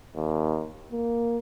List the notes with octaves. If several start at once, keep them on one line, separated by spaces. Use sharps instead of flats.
D#2
A#3